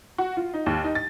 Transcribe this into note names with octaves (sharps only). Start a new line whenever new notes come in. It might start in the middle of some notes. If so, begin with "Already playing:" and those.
F#4
F4
D#4
D#2
D#4
A6